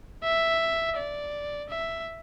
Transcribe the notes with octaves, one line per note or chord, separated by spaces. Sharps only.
E5
D5
E5